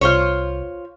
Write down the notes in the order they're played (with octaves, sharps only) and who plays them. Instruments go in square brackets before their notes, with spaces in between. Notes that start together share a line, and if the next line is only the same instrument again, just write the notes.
[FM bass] C2 [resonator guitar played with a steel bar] F4 C5 C#5